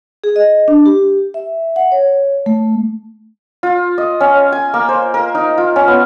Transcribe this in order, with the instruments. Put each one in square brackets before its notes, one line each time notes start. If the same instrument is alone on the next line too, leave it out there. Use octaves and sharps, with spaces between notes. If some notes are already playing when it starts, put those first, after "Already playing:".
[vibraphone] G#4
D#5
D4
G4
E5
F#5
C#5
A3
[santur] F4
D#5
C#4
G#5
A#3
C5
A#4
D#4
F4
C#4
B3